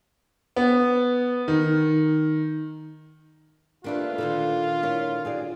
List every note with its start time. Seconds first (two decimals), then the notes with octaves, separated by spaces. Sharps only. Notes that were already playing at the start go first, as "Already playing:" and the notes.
0.56 B3
1.48 D#3
3.84 G3 A3 A#3 D4 F4 B4
4.18 A#2 D3 D#3 A4
4.83 E4 A#4 C#5
5.25 F4 F#4 G#4 D5